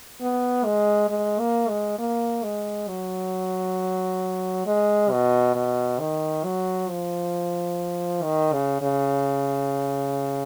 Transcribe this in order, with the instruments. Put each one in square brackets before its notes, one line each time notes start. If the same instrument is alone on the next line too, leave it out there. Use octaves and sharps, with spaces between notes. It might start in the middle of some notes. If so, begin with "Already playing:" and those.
[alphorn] B3
G#3
G#3
A#3
G#3
A#3
G#3
F#3
G#3
B2
B2
D#3
F#3
F3
D#3
C#3
C#3